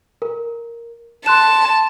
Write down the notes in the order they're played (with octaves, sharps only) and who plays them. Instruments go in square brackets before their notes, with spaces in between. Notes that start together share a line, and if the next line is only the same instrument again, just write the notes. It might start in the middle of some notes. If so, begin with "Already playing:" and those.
[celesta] A#4
[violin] A5 [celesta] C6 F#6 E7